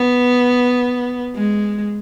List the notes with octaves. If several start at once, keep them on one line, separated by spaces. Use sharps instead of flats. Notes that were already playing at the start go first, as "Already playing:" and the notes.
Already playing: B3
G#3